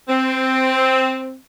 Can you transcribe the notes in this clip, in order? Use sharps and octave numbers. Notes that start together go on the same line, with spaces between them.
C4